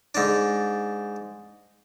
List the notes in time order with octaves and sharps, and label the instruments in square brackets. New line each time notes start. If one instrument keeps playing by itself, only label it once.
[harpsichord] G#2 D4